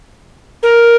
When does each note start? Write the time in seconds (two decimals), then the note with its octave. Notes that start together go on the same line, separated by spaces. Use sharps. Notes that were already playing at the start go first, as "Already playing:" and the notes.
0.63 A#4